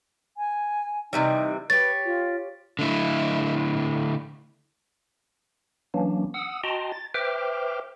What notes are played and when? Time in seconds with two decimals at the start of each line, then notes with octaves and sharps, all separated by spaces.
0.37 G#5
1.13 C3 E3 G3 D#4
1.70 G4 B4 C#5 A6
2.05 F4
2.79 D3 A3 E4
5.94 E3 F#3 A#3 C#4 D4
6.34 F#5 D#6 E6
6.64 F#4 D#5 G5 A5 A#5 C6
6.92 A6
7.14 B4 C5 E5 G5 D6 F6